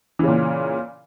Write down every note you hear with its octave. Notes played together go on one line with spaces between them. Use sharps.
A#2 C#3 E3